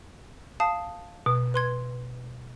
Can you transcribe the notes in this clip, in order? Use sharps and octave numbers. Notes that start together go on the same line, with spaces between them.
F5 A5 D#6
B2
B4 C6 G#6